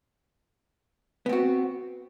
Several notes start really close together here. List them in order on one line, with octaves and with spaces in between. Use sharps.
B3 C4 F#4